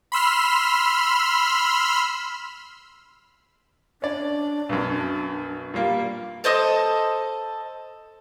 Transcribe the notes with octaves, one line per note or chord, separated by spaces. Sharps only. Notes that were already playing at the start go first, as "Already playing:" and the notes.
B5 C6 E6 F6
C#4 D4 D5
B1 F#2
A#2 G3 A#3
A4 C5 D#5 D#6